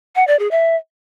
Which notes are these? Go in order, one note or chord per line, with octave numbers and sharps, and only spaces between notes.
F#5
D5
G#4
E5